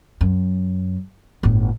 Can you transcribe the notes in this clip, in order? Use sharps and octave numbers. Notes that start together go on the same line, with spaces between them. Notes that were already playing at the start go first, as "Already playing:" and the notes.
F#2
G1 A2